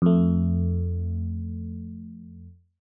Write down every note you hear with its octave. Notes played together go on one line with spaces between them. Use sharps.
F2 A3